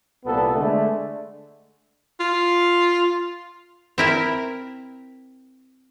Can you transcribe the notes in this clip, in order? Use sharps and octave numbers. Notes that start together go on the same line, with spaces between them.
C2 A#2 B3 A4
D3 G#3 A3
F4
C4 E4 A#4